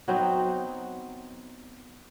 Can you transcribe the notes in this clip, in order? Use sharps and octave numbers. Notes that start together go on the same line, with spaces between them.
F#3 B3 C4 D#4